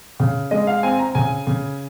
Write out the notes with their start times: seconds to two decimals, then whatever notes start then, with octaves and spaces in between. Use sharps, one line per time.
0.20 C#3
0.51 G#3 D#5
0.67 F5
0.83 C4 G#5
0.99 A#5
1.15 C#3 G#5
1.47 C#3